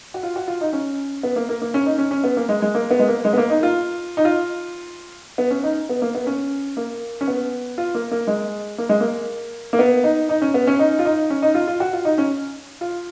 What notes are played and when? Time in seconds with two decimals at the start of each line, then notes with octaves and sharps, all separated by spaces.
0.14 F#4
0.23 F4
0.36 F#4
0.48 F4
0.61 D#4
0.73 C#4
1.23 B3
1.36 A#3
1.49 A#3
1.62 A#3
1.74 C#4
1.86 D#4
1.98 C#4
2.11 C#4
2.24 B3
2.37 A#3
2.49 G#3
2.62 G#3
2.75 A#3
2.91 B3
2.99 G#3
3.08 A#3
3.25 G#3
3.33 B3
3.38 A#3
3.50 D#4
3.63 F4
4.17 D#4
4.25 F4
5.38 B3
5.51 C#4
5.64 D#4
5.89 B3
6.02 A#3
6.15 B3
6.27 C#4
6.77 A#3
7.21 C#4
7.28 B3
7.78 F4
7.95 A#3
8.11 A#3
8.27 G#3
8.78 A#3
8.89 G#3
9.00 A#3
9.73 A#3
9.79 B3
10.04 D#4
10.29 D#4
10.42 C#4
10.54 B3
10.67 C#4
10.79 D#4
10.99 F4
11.05 D#4
11.30 C#4
11.42 D#4
11.55 F4
11.67 F4
11.80 F#4
11.93 F4
12.05 D#4
12.18 C#4
12.81 F4